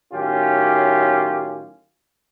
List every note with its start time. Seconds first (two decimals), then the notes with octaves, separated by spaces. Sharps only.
0.13 A2 D#3 F#3 C#4 F4 G4